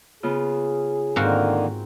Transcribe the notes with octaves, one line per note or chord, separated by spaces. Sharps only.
C#3 B3 F4 G#4
G#2 D3 D#3 A#3 C4 F#4 A#4 F5